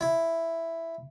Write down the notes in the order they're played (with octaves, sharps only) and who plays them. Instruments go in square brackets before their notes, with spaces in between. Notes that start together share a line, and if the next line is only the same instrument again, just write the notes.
[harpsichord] E4